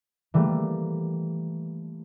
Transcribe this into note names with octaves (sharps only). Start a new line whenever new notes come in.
E3 G3 A3 A#3